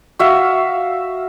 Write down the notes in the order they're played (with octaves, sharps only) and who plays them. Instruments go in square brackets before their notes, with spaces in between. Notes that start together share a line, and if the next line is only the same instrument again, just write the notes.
[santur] F#4 E5 F5